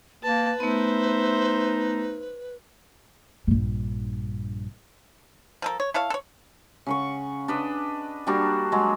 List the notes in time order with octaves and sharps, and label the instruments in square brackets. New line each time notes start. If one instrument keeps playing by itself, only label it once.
[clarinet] A#3 [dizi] B4 [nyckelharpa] A5
[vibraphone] A3 B3 [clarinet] D#4 [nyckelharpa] C5 E5
[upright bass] A#1 G2
[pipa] F3 A4 A#4
C#5
E4 A4 C#5 F5
A4 C#5
[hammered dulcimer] C#3 F#5 C#6
D4 B4 D#5
G3 A#3 D4 F#4
F#3 G#3